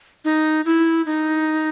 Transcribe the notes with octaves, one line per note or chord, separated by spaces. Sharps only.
D#4
E4
D#4